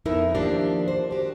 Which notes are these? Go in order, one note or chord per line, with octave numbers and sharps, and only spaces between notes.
F2 B3 D#4 E4 A#4 E5
D#3 F3 A#3 D4 G4
C5
F#4 G4